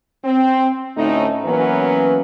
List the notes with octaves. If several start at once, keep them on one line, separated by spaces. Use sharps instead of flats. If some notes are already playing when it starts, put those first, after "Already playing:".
C4
D2 A2 A3 C#4 D#4
E3 F#3 A#3 B3 C#4 B4